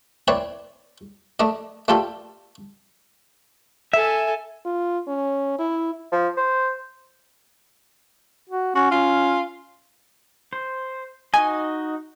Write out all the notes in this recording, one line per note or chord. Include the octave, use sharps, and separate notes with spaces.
C4 E4 B4 C#5 D5
A3 D4 D#5
A3 D4 F4 G4 A4
A4 E5 G#5
F4
C#4
E4
F3
C5
F#4
C#4 F#4
C#4 F4
C5
D#4 F#4 D#5 G#5